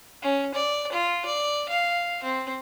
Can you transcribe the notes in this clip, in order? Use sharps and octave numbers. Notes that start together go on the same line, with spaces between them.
C#4
D5
F4
D5
F5
C4